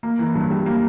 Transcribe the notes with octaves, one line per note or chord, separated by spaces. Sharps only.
A#3
E3
G2
G3
A#3